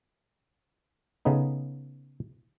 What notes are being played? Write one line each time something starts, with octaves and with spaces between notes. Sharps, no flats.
C#3 A3 B3 D#4